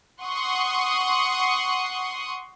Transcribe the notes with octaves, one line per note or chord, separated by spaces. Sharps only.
F#5 C6 C#6 D#6